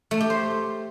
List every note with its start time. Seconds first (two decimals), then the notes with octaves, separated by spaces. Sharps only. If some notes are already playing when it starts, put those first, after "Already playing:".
0.11 A3
0.20 G4
0.30 C5